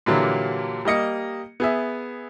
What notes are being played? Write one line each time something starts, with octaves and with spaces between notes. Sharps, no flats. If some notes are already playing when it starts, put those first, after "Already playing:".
A#2 D3 E3 F#3 G3 A#3
G3 A#3 D#5 C#7
B3 G#4 E5